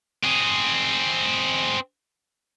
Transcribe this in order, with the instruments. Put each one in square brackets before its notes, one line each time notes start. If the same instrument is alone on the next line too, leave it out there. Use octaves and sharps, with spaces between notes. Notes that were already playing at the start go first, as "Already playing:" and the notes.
[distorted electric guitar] C4 G#4